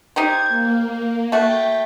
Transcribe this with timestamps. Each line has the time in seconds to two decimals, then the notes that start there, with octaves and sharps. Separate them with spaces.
0.16 D#4 G4 C5 G#6
0.49 A#3
1.32 A3 F#4 G5